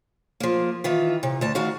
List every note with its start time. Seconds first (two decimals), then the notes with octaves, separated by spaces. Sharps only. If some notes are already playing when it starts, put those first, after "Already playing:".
0.40 F3 A#3
0.84 D#3 E3 F4
1.23 C3
1.41 D2 A5
1.55 D#3 F#4 F5